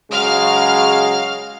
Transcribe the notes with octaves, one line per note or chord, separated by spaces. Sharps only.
C#3 F#3 G#3 F5 F6